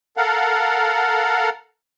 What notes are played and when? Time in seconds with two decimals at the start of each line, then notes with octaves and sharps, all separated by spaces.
0.17 A4 A#4 F5 F#5